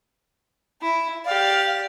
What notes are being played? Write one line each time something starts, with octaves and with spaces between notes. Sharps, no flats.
E4
G4 D5 F5